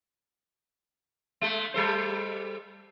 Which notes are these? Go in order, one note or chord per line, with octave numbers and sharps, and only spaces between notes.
G#3 A3 A4
G3 A4 C5